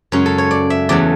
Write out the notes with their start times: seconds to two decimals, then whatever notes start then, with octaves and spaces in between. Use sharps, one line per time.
0.12 F#2 C#3 G#3 C#4
0.26 A4
0.38 C#5
0.51 D5
0.70 E5
0.89 E2 C#3 F#3 A3 D5